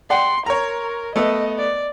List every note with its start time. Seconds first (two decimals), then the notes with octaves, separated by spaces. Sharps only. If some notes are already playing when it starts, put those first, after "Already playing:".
0.10 D5 F#5 G5 C6
0.46 A#4 C#5 A#5
1.16 A3 B3 A4 D#5
1.58 D5